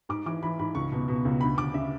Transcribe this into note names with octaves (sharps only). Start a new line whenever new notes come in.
G#2 D6
E3 D6
E3 B5
G#2 B5
C#2 C#6
B2
B2
C#2
D2 B5
D2 D6
C#3 E5